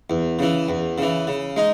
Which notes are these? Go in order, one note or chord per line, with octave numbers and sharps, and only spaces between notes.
E2
C#3 E3
E2
C#3 E3
C#3
G#3 D#4